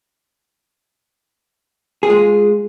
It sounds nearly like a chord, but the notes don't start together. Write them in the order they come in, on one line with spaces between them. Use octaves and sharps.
G#4 F4 G#3